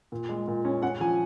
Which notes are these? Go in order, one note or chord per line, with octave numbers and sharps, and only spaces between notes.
A#2
G#3
A#2
C#4
C#4 F#5
F3 G#5